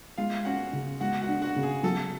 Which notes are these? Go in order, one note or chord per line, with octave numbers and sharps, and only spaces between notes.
G#3 F4 F5
C#4 F#4 F#5
C#3
G#3 F#4 F#5
F#4 F#5
D4
F#4 F#5
C#3
G#4
F#3 A4